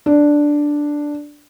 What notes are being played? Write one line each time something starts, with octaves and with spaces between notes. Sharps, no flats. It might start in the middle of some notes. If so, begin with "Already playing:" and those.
D4